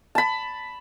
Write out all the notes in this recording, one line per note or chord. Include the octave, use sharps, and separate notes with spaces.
A5 B5